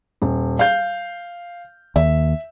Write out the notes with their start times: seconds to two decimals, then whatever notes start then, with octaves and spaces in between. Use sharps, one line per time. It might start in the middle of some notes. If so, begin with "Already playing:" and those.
0.22 D#1
0.59 F5 G6
1.96 D#2 E5